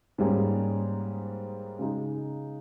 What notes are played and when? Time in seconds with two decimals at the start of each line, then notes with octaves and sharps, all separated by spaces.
0.18 G#2 G3 A#3 C#4 G#4
1.79 C#3 G#3 D#4 G#4